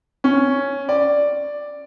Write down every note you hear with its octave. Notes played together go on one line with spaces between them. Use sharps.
C#4
D5